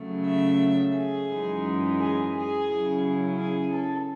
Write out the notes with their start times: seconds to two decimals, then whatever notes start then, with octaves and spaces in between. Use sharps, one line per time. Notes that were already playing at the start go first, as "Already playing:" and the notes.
Already playing: C#3 F#3 A3
0.25 E5
0.94 G#4
1.29 F#2 E3 G#3 D#4
1.98 G#4
2.34 G#4
2.68 C#3 F#3 C#4 E4
3.37 G#4
3.72 A4